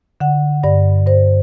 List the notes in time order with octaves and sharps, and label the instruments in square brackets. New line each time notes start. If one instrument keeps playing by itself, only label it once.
[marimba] D3 F#5
G2 D5
G2 C5